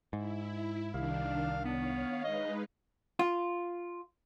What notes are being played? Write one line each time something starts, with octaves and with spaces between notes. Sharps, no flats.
G#2 E4
C2 D#3 D4 F5
B3 C#5 F5
G#3 D#4 B4 D#5
F4